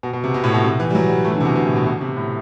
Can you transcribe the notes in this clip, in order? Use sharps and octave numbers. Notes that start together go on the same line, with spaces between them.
B2
B2
C3
B2
A2
B2
C3
E3
G3
F#3
G3
A3
E3
D3
C3
B2
B2
A2
B2
B2
C3
A2